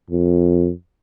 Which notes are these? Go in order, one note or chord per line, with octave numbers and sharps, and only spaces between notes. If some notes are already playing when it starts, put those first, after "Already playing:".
F2